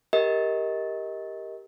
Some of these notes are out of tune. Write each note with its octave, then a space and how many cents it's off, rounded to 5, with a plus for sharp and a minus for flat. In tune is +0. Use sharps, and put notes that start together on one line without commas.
G4 +5 A#4 +0 D#5 +25